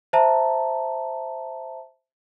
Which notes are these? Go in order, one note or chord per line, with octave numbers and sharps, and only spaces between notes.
C5 E5 A5 A#5